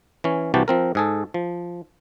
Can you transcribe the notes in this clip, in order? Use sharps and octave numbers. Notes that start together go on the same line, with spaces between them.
E3 C#4
C2 C3 E3 F#4 G4 A5
F3 C4 A#4
G#2 G#4 A4
F3